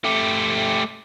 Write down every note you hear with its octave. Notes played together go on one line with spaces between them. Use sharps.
A3 G4